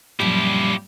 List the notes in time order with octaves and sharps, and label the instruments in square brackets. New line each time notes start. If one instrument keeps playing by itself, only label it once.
[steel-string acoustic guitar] F#2 A#2 F3 [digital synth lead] G3 [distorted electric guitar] E4 G4